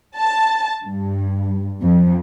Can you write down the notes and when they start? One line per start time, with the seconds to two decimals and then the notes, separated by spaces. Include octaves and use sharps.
0.17 A5
0.82 G2
1.83 F2